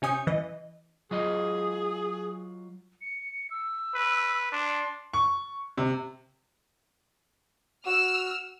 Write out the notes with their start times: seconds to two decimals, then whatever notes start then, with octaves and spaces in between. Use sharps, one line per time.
0.02 C3 C#4 G#5 D#6 G6 C#7
0.27 E3 D#5
1.11 F#3 F4 G#4 D#5
3.01 C#7
3.51 E6
3.94 B4
4.52 D4 C6
5.13 C#6
5.77 C3
7.86 F#4 E6 F6